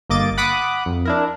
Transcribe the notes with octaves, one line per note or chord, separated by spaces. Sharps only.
G1 A#3 D#5 D6 A6
F#5 B5 D6 D#6 F#6
F2
D4 E4 A#4